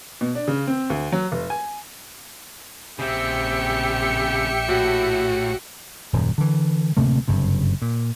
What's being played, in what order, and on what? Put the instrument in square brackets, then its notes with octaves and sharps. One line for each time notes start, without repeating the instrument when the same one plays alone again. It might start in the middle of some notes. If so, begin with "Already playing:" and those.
[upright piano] B2
D4
C#3
C4
D2
F#3
F1
G#5
[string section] A#1 G5 C#7 [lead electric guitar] C#3 C4 [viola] G4 E5
[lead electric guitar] A2 [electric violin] F#4
[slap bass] D#1 F#2
D3 E3
D1 C3 A3 A#3
F#1 G2 C3
A#2